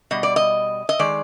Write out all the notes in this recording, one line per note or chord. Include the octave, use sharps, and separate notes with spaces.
B2 G3 D#5
D5
D#5
D#5
D#3 G#3 D5